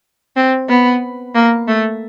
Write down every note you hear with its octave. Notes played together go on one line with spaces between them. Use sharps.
C4
B3
A#3
A3